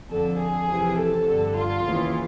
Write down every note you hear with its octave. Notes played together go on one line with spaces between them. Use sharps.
F2 D3 A4
G#4
F2 C3 E3
A4
G2 D3
F4
D#2 C#3 E3